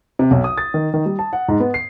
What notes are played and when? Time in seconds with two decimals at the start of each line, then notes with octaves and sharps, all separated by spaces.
0.19 C3
0.31 B1
0.44 D#6
0.58 A6
0.74 D#3
0.94 D#3
1.06 G3
1.19 A5
1.33 F#5
1.49 G#2
1.60 B3
1.74 C7